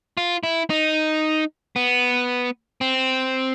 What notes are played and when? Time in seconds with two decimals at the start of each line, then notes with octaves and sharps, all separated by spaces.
0.17 F4
0.43 E4
0.70 D#4
1.76 B3
2.81 C4